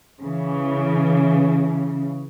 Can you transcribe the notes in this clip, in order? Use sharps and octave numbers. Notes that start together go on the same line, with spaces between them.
C#3 E3